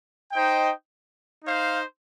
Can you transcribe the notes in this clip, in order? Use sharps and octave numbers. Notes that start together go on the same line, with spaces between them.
D#4 C5 D#5 G5
D#4 C5 F5